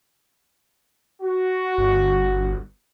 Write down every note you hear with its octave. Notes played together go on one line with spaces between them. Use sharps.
F#4
G1